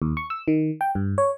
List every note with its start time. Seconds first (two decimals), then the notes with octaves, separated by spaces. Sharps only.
0.02 D#2
0.17 C#6
0.30 E6
0.48 D#3
0.81 G5
0.95 G2
1.18 C#5